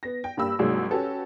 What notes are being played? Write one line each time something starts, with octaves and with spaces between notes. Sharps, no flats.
B3 A#6
G5
G2 A#3 G4 B5 E6
C2 G#2 F#3 G#3 A#3
C#4 F#4 G4 A4 B4